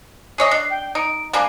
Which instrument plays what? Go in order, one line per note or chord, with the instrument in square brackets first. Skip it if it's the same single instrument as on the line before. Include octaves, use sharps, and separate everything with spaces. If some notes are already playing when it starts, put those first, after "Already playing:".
[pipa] G#4 C#5 D#5 [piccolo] C7
[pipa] D4
[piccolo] G5
[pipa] D#4 [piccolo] D7
[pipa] G3 A#3 D4 [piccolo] G#5